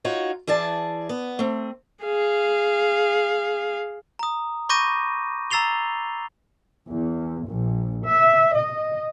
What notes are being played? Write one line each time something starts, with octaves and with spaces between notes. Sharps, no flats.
D#4 F4 F#4 C#5
E3 G#4 D5 A5
B3
A3 C4
G#4 F5
A#5 D#6
B5 C#6 D6 G6 A#6 D#7
A#5 E6 A6 C7 F7 G7
E2
A#1
E5
D#5